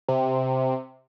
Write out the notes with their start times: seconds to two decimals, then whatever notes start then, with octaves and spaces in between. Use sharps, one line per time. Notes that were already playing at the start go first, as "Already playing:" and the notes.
0.08 C3